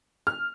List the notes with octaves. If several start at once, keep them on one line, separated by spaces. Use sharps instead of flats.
F6